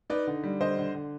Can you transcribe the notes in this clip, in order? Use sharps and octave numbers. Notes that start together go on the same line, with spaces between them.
D#4 B4 D5
D3
G3
D3 C5 D#5
D3
D3